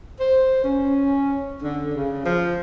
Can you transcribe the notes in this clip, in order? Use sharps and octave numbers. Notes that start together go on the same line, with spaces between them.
C5
C#4
D3
C#3
F3